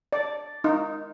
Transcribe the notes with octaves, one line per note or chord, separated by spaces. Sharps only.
D5
D#4